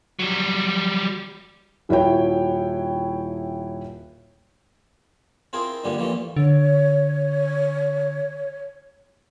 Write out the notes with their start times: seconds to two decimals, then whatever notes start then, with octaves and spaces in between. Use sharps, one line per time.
0.19 F#3 G3
1.89 D#1 E4 F#4 C#5 G5
5.53 C4 E4 F4 G#4 A#4 C6
5.84 G2 A#2 D3 G3 G#3 A#3
5.98 A#1 A#2 E3 F3 G3 A3
6.36 D3 C#5